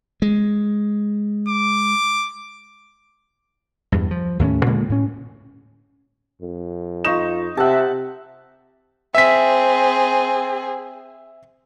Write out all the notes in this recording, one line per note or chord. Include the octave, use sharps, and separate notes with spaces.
G#3
D6
E2 G2
F3
D#2 A2 F3 C#4
A#2 D3 G#3 A#3
A2 C#4
F2
D#4 F4 C#6 E7
C3 G4 E5 F#5 A5
C4 G#4 E5 B6